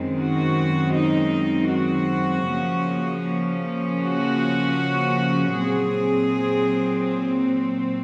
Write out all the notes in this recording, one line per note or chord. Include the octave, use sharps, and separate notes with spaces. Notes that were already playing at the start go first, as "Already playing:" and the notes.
Already playing: F#2 D#3 G#3 C4
F#4
D#4
F#4
C#3 F3 A#3 C#4
F#4
A#2 F#3 C4 G#4